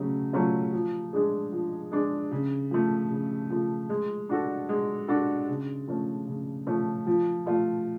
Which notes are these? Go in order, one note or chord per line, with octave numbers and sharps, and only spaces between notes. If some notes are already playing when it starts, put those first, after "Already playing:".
Already playing: C#3 F#3 A3 C#4
F#3 A3 C#4 F4
F3
G#3 D4 G#4
F3
G#3 D4 G#4
C#3
F3 A3
C#3
F3 A3
G#3
D4 F#4 A4
G#3
D4 F#4 A4
C#3
F3 A3 C#4
C#3
F3 A3 C#4
F3
A3 F4